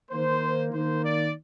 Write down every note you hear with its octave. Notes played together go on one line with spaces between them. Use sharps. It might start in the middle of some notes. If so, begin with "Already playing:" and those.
D#3 A#3 C5
D#3 A#3 C5
D5